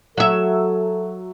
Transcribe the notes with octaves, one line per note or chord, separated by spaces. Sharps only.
F#3 A4 E5